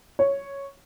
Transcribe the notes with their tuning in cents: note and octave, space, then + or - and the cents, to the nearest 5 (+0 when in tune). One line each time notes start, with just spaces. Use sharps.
C#5 +0